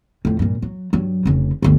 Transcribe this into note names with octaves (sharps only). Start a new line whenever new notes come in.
F2 A2
G2 A#2
F#3
G2 F#3
F1 C#3
G1 D2